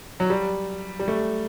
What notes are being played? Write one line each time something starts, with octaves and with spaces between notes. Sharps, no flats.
F#3
G3
G3
A3